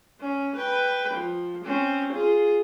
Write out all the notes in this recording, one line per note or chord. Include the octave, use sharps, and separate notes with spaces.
C#4
B4 G5
F3
C4 C#4
F4 G#4